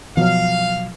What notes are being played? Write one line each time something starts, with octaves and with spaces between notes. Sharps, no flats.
B2 F3 F#3 F5